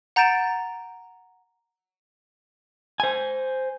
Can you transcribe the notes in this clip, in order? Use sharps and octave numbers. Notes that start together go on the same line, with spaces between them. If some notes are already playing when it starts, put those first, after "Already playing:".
F#5 A#5 G6 A6 D7 E7
C5 G#5